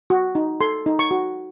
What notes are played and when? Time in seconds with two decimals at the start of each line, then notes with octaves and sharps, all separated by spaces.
0.10 F#4
0.35 D#4
0.61 A4 C6
0.86 D#4
0.99 C#6
1.11 F#4